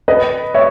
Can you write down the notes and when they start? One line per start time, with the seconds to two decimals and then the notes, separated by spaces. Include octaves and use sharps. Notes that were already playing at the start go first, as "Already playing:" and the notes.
0.08 B4 D#5
0.54 C#5 E5